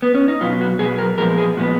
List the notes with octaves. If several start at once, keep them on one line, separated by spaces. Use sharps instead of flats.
B3
C#4
D#4
B2 F#3 B3 F4
F#4
B2 F#3 B3 G#4
A#4
A#2 F3 G#3 B3 A#4
G#4
A#2 F3 G#3 B3 F#4